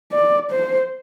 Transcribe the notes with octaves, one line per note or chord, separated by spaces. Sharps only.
D5
C5